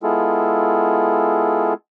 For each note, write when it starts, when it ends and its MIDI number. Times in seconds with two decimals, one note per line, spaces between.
0.03 1.74 56
0.03 1.74 59
0.03 1.74 64
0.03 1.74 65
0.03 1.74 68
0.03 1.74 69